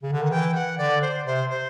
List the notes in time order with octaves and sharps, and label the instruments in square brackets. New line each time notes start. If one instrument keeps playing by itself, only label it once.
[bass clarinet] C#3
D3
[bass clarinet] D#3 [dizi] F#5
[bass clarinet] E3 [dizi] G5
[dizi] F#5
[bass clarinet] D3 [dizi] D5
[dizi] C5
[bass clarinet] C3 [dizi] C5
[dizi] C5